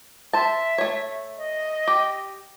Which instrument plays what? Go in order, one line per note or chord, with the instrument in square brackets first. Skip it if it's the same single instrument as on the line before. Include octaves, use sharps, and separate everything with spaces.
[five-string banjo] C5 A5 [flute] E5
[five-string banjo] A3 C#5
[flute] D#5
[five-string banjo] G4